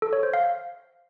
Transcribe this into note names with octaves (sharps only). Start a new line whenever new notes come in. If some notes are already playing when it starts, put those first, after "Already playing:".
A4
C#5
C5
F5